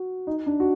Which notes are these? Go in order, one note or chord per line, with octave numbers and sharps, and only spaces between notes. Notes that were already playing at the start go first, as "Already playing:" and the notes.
Already playing: F#4
D#4
D4
F#4